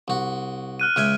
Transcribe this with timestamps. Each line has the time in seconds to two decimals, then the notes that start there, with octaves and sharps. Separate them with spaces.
0.08 C2 F#4
0.80 F6 F#6 D#7
0.96 C#2 E5 G#5 F6 D7